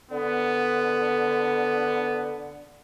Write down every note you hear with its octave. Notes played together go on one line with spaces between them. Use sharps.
D3 B3